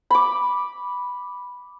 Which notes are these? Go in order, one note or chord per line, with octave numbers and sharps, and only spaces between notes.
B5 D6